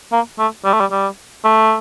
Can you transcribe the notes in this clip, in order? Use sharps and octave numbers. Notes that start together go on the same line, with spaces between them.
A#3
A3
G3
A3
G3
G3
A3